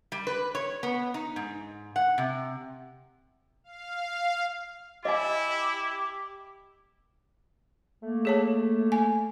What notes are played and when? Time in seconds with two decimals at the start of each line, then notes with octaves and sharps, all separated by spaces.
0.12 G3
0.27 B4
0.55 C#5
0.83 B3
1.14 D#4
1.36 G#2
1.96 F#5
2.18 C3
3.64 F5
5.05 E4 G4 D#5 F5 G#5
8.03 A3 A#3
8.25 G#4 C#5 A5
8.92 G#5